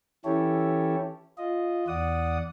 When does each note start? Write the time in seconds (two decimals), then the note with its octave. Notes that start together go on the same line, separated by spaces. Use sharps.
0.25 E3 C#4 E4 G4 A4 C#5
1.38 F4 D#5
1.88 E2 D5 F#5 D#6